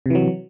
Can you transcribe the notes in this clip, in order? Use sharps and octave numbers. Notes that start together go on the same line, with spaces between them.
C3 E3 F#3